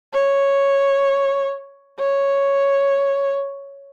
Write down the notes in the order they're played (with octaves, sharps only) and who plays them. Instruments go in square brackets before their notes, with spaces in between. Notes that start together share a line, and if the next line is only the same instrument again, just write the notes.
[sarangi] C#5
C#5